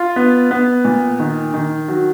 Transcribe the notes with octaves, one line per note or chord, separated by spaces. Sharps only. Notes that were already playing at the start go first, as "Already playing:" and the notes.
Already playing: F4
B3
B3
A#2
D#3
D#3
F#3